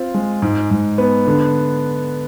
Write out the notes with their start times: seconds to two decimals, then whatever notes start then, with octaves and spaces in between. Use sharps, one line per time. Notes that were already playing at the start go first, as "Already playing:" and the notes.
Already playing: C4 F4
0.14 G#3
0.42 G#2
0.71 G#2
0.98 B3
1.27 D3